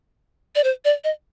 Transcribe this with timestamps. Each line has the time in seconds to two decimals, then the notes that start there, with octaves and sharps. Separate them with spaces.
0.55 D5
0.64 C5
0.85 D5
1.04 D#5